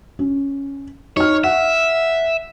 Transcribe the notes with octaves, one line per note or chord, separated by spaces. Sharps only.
C#4
D#4 C#5 F6
E5 F#5